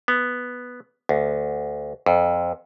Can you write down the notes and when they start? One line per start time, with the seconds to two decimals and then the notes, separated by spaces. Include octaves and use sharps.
0.08 B3
1.09 D2
2.06 F2